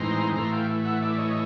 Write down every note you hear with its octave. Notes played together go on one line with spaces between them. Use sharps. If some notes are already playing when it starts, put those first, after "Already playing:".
Already playing: A2 E3 G#3 C4 D#4 A#5 C6
A2 E3 A3 A#5 C6
F5 G5
E5 F#5
D5 E5
C#5 D#5